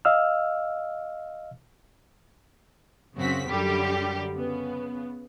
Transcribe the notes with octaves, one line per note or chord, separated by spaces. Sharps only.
D#5 F5 E6 F6
F#2 C#3 C4 F#4 B6
F#2 D3 G3 G4
C#3 B3